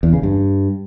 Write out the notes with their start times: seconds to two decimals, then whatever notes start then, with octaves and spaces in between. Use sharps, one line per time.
0.03 E2
0.13 C#3
0.23 G2